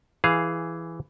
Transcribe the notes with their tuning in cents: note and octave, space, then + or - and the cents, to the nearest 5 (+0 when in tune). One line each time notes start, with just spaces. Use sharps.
E3 +5 G#4 +0 F5 +0